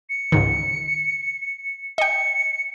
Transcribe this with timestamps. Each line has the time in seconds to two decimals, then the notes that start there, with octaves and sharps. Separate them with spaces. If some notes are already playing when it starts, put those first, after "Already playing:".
0.09 C#7
0.32 C#2 G#2 D#3
1.98 D#5 G5 C#7